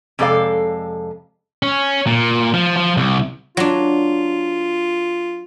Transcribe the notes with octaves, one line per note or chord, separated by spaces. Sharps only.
F2 C3 G#3 A4 D5 F5
C#4
A#2
F3
F3
C2
F#3 D4 F4